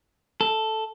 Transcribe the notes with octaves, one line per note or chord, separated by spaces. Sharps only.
A4